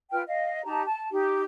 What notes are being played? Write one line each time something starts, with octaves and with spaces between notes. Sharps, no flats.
F4 B4 G5 F6
D#5 F5
D#4 G4 A5 A#5
A5
D#4 G4